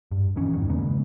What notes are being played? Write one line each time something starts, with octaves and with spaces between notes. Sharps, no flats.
G2
D#1 D#3 E3 C#4
E1 E2 G2 D#3
C#3 G#3 A#3 B3